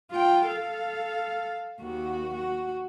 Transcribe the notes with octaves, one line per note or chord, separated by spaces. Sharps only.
F4 G5
A4 F5
D#2 F#4
F#4